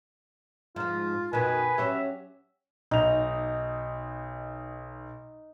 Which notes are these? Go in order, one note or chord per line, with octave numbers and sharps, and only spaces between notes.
G#2 F3 F4
F#2 B2 D#3 B4 G#5
F#3 C#4 G4 E5
B1 D#4 F7